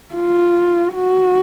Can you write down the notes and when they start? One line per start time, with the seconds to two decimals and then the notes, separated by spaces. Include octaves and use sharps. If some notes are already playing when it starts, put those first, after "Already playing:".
0.14 F4
0.95 F#4